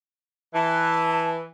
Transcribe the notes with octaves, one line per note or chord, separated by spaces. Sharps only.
E3 A5